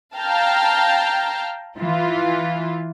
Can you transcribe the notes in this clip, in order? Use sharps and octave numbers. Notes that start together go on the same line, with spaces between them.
F5 G5 A5 A#5 F6
E3 F4